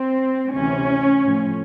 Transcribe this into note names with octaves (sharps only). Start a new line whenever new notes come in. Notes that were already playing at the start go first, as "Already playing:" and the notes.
Already playing: C4
D2 C3 E3 C#4
A2 F3